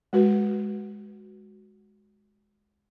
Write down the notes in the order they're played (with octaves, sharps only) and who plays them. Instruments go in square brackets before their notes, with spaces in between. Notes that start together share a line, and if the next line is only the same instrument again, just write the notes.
[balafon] G#3 F#4 B4